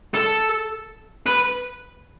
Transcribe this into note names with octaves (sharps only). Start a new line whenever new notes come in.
A4
B4